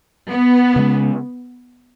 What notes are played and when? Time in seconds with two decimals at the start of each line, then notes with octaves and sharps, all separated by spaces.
0.28 B3
0.76 C#3 G#3 C#4